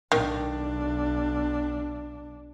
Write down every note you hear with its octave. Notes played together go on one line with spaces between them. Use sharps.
B1 D#3 D4